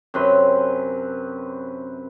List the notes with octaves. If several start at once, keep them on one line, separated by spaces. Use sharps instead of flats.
F#2 C3 B4 C6